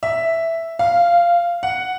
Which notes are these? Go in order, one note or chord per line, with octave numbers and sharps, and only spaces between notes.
E5
F5
F#5